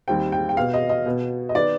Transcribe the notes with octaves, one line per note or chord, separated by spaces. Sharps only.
D#2 D#3 G3 C4 G5
G5
G5
B2 B3 F5
D#5
D#5
B2 B3
D#5
D#3 B3 D5